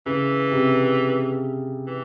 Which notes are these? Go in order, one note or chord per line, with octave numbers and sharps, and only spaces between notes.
C#3 E3
C3
E3